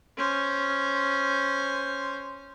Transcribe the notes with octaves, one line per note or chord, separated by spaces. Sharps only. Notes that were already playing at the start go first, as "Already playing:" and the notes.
C#4 C5